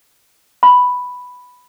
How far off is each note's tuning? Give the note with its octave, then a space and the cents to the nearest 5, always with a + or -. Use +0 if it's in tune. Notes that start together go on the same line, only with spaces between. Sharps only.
B5 +5